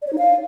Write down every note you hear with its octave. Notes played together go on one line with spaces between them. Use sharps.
D5
C#5
D#4
F5